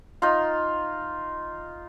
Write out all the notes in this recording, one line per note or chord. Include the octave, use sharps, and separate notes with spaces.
D#4 F4